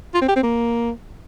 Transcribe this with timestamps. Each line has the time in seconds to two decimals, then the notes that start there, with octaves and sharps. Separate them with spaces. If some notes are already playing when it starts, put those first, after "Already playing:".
0.14 F4
0.22 C4
0.29 G4
0.36 C4
0.43 A#3